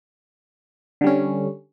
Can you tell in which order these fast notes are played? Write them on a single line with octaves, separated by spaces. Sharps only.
D3 G3 C#4